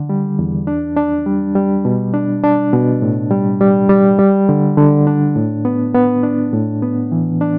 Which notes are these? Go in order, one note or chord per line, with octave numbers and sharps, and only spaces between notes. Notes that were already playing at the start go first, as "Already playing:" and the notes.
Already playing: D3
G3
E2
D4
D4
G3
G3
B2
D4
D4
B2
A2
G3
G3
G3
G3
D3
D3
D4
A2
B3
B3
D4
A2
B3
E3
D4